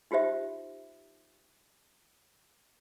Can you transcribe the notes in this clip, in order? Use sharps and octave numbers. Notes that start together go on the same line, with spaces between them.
D#4 F4 G4 C5 E5